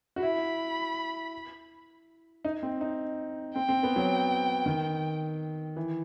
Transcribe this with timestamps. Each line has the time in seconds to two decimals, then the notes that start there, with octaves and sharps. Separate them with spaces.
0.16 F#4
0.22 E4 B5
2.45 D#4
2.63 C4
2.81 D#4
3.55 C4 G5
3.69 C4
3.83 B3
3.96 F#3
4.66 D#3
5.77 E3